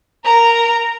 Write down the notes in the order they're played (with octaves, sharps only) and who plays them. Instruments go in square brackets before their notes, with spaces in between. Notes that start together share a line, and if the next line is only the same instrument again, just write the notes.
[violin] A#4 A#5